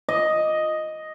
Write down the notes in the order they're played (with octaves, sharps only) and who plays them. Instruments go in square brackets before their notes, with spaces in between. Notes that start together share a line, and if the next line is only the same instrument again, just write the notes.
[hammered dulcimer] D#5